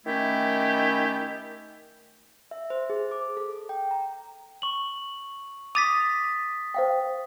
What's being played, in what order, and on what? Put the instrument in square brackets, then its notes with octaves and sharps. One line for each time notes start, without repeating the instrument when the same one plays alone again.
[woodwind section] D#3 A3 C#4 E4 G4
[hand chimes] E5
C5
G#4
D6
A4
G5
A#5
[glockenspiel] C#6 F#7
[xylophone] D6 D#7 F7 [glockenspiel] D#6 A6 B6
[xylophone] C5 F5 G5